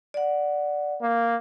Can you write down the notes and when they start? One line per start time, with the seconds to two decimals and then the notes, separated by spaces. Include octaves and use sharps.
0.14 D5 F#5
1.02 A#3